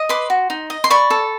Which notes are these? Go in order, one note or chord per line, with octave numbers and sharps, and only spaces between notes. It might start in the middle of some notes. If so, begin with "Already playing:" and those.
Already playing: D#5
B4 C6 D6
F#4
D#4
D#5
C6
D5 B5 C#6
A4